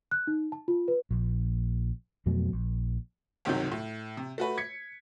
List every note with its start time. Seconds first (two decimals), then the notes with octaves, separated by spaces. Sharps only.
0.11 F#6
0.27 D#4
0.52 A5
0.68 F4
0.88 B4
1.11 A#1
2.26 F2 B2 F#3 A3
2.53 A#1
3.45 G1 C#2 C3 D#3 F#3 G6
3.72 A2
4.17 C3
4.38 A3 F#4 B4
4.58 G#6 B6 C#7